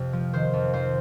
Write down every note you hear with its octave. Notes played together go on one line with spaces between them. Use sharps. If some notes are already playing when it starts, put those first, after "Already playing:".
Already playing: F2 C3
F3
D#3 C5
F2
F2 C5